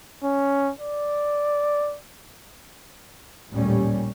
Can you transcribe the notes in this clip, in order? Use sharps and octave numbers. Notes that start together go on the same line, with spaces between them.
C#4
D5
A1 D#2 A#2 G3 A3 C#4